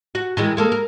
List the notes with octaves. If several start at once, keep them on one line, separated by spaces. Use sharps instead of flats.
F#4
D#3 E3 G#3
G#3 A#3 A4
A#4